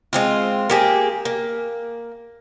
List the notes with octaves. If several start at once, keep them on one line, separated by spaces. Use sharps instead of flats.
G#3 C4 F4
A#3 G4 G#4
A#3